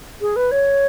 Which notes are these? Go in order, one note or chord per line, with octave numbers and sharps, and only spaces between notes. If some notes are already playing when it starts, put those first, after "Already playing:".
G#4
B4
C#5